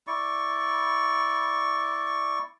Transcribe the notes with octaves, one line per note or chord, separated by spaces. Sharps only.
E4 D5 C#6